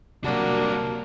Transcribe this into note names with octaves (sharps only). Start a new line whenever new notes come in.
C2 C3 F#3 A#3 D4 F#4